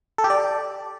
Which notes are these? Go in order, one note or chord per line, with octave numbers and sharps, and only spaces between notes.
A4
G4
D5